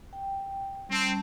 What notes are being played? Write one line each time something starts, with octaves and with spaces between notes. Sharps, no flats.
G5
G3 C4 C#4 A5